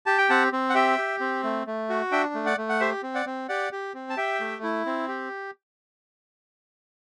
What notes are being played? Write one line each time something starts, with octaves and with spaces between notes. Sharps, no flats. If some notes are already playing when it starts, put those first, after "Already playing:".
G4 A5
G5
C4 F#5 A5
C4
F#5
G4 E5 G5
G4
C4
A3
A3
F#4
D4 E5 G5
A3
D5 F#5
A3
F#5
G4 C5 E5
C4
D5 F#5
C4
G4 D5 F#5
G4
C4
A5
G4 E5 G5
A3
E4
C4
G4